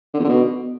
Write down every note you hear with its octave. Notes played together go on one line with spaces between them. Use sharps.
D3
E2
D3
B2